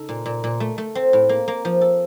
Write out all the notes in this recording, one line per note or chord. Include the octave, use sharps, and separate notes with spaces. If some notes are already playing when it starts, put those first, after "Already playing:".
Already playing: C#3 D#4 A4
A#2
A#2
A#2
A3
A3
C4
A2
A#3
A#3
F3
A4